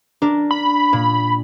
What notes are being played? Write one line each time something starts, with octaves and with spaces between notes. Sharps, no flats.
D4 A#4
B5
A#2